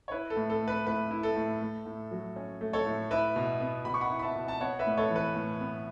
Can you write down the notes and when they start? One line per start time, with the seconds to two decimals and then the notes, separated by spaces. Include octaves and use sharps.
0.08 C#5
0.11 E4 B4
0.30 A4
0.36 A2
0.50 A4
0.62 A3
0.68 B4
0.87 A2 B4
1.11 E4
1.23 A4
1.36 A2
1.61 A3
1.86 A2
2.11 F#3
2.36 C#4
2.61 A3
2.73 A4 C#5
2.86 A2
3.10 E4 B4 E5
3.36 B2
3.61 B3
3.85 B2 B5
3.94 C#6
4.01 F#5 B5
4.10 E4
4.19 B5
4.22 E5 A5
4.36 B2
4.48 A5
4.61 B3 C#5 F#5
4.79 B4 E5
4.86 A2
4.97 A4 C#5
5.10 E3
5.16 B4
5.35 A2
5.60 B3